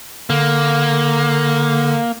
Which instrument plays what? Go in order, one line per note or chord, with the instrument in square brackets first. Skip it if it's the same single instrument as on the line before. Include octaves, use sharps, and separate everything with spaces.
[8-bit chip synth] D3 [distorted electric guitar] A#3